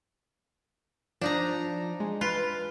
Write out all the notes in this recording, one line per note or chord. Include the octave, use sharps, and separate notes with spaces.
F3 D4 D#4 A#5
G#3
F4 B4